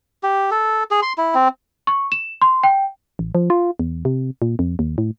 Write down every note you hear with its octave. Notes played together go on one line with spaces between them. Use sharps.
G4
A4
G#4
C6
E4
C4
C#6
E7
C6
G5
A1
F3
F4
E2
C3
A#2
F2
D#2
A2